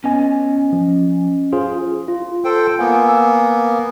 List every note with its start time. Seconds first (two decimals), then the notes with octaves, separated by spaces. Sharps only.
0.04 B3 C#4 D#5 G#5
0.72 F3
1.53 F4 G#4 C5
2.08 F4
2.45 A4 C5 G5
2.79 A#3 B3 F#5 G#5
3.09 G#5 E6